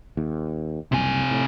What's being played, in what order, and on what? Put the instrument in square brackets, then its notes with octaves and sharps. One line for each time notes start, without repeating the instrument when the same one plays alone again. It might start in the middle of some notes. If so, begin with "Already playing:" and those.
[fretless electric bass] D#2
[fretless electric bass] F#1 C2 [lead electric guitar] C3 G#5
[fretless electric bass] A2